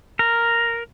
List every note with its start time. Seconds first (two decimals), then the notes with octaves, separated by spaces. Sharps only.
0.19 A#4